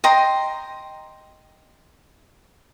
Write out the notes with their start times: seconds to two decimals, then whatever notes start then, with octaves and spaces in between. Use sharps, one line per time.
0.04 D#5 G5 A#5 C6